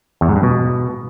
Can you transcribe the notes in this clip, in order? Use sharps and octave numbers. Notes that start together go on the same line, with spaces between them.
E2
G#2
G2
B2